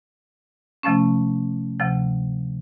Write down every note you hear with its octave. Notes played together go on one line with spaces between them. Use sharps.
C3 F3 A3 C#4
D2 C3 F3